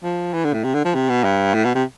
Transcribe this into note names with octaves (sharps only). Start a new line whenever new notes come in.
F3
E3
D3
A2
C3
D3
F3
C3
B2
G2
A2
B2
C3